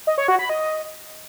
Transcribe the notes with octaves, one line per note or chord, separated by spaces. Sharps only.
D#5
C#5
F#4
B5
D#5